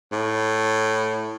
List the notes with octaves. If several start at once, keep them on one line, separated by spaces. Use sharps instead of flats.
A2